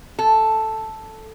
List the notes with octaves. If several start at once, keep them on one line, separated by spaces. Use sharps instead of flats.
A4